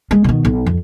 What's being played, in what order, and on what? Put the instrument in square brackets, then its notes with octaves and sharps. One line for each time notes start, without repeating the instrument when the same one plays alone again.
[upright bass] G#3
B2 D#3
B1
F2